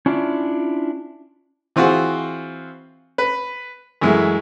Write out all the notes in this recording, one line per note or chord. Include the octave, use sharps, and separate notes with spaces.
C#4 D4 E4 F4 D5
E3 C4 F4 F#4 G#4
B4
F#2 E3 G#3 A3 E4